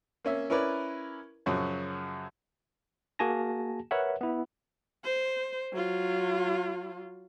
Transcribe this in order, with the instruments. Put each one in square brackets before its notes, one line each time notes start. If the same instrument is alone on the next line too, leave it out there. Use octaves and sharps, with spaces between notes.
[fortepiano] A#3 C#4 E5
C#4 E4 A#4 B4 D5
F#2 C#3 F3 F#3
[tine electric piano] A#3 F#4 G#4 G#5 A5 A#6
A#4 B4 C#5 E5 F#5
B3 E4
[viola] C5
F#3 F4